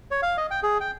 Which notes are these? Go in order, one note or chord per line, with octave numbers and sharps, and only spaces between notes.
C#5
F5
D#5
G5
G#4
G5